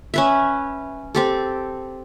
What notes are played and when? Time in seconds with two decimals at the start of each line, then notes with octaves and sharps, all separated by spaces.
0.14 C#4 B4 E5
1.15 C4 G4 A4